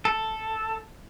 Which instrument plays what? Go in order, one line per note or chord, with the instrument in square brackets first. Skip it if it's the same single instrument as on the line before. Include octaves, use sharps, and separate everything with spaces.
[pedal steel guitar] A4